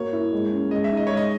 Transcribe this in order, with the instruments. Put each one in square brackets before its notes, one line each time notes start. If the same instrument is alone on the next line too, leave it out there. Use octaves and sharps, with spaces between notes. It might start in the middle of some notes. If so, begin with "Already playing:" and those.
Already playing: [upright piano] A#3 F#4 [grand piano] C#5
[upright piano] E4
G#3
C#4
[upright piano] G#3 [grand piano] D#5
[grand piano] E5
[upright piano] D#4
[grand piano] D#5
[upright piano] G#3 [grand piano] C#5
[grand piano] D#5